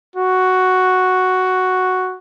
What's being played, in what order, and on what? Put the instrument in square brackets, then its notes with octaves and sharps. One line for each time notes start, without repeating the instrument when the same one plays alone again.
[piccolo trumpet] F#4